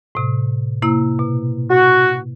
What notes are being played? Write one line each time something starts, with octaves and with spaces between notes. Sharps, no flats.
A2 C3
C3 A#3 E4
B2
F#4